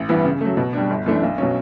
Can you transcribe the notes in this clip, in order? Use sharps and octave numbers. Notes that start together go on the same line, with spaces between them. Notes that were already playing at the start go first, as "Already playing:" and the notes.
Already playing: A1
G2 E3 B3 E4
C#3
F#3 A3
B2
G3 D4
G1
F#2 E3 A3 D4
B1
B2 F#3 C#4